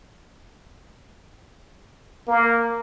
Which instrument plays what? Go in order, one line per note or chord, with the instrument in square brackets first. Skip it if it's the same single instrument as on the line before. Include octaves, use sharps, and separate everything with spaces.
[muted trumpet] A#3